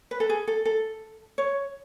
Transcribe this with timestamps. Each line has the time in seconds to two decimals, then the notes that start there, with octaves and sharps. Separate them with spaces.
0.11 B4
0.20 A4
0.29 G#4
0.47 A4
0.65 A4
1.38 C#5